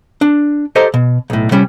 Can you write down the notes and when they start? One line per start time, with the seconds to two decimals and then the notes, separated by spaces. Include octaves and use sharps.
0.21 D4
0.76 G4 A4 C5 D#5 A#5
0.94 B2
1.30 B1 A2
1.51 C3 G3 C#4